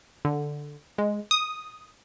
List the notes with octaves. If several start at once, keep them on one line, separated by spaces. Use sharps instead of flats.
D3
G#3
D#6